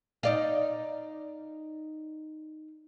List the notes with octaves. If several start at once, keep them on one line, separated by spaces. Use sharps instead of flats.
D#4 D5 F5